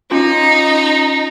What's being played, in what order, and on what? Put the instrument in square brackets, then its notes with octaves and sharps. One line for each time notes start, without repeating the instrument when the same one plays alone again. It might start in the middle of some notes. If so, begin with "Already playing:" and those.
[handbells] C#4 F4 [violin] D#4